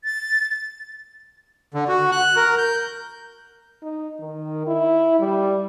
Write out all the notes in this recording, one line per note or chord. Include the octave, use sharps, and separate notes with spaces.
A6
D3
F#4
F#6
A#4
G6
D#4
D#3
E4
G3